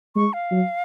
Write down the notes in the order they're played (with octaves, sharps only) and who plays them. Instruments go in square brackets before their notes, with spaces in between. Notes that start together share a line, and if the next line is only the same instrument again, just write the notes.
[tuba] G#3 [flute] C#6
[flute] F5
[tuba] F#3